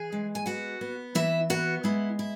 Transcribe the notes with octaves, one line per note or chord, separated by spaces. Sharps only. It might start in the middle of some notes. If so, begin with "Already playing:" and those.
Already playing: E3 G#4 G#5
G#3
G#5
B3 F#4 F#5
B3
E3 E4 E5
B3 F#4 F#5
G#3 E4
E4